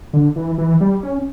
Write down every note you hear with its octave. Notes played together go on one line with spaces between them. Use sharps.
D3
E3
E3
G3
C#4